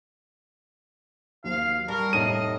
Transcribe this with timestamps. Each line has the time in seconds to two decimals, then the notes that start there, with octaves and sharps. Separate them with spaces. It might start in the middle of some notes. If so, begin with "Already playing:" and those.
1.44 D#2 F#3 C5 F5
1.88 G3 A#4 A5 C#6
2.13 F1 A2 D#4 D#5 A5 D#7